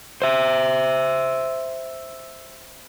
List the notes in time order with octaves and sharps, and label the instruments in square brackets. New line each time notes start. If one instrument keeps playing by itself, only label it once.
[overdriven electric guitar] C5 E5